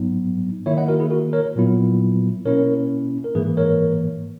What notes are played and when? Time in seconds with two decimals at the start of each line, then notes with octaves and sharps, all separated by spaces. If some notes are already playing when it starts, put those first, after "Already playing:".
Already playing: G#2 F#3 B3 D#4
0.66 D#3 A#3 E4 C#5 E5
0.77 D#5 F#5
0.88 F#4 A#4
1.00 E4 G#4
1.10 F#4 A#4
1.33 A#4 C#5
1.56 A#2 F#3 B3 E4
2.45 B2 A#3 C#4 E4 A#4 C#5
3.24 A#4
3.35 G#2 E3 A#3 G#4 B4
3.57 A#4 C#5